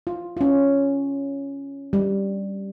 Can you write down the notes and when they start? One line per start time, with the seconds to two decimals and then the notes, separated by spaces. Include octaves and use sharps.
0.07 F4
0.37 C#4 F4
1.93 G3